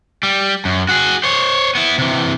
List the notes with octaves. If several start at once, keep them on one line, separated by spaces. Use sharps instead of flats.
G3
F#2
F#4 G#4
C5 C#5
B3 E4
C3 E3